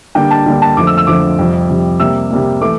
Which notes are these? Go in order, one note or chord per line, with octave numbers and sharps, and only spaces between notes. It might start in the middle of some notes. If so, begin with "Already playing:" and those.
D3 G3 A#3 D4 G5
A5
D3 G3 A#3 D4
A5
F2 D3 F3 A3 D6
E6
E6
F2 D3 F3 A3 D6
F2 C3 G3
F2 C3 G3
C3 G3 A#3 E6
C3 G3 A#3
E3 A3 D6